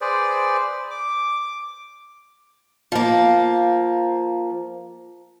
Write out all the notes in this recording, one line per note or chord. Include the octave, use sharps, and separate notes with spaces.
G#4 B4 C5 D5
D6
F3 A#3